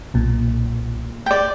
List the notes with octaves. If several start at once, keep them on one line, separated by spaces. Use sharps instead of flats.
B1 A#2
D5 G5